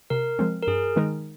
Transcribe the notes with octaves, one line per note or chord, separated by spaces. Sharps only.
C3 A#4
F3 G#3 C4
A#4
G2 G#4
D#3 G#3 D#4 A#4